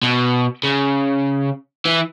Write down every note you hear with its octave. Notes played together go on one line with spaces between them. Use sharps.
B2
C#3
E3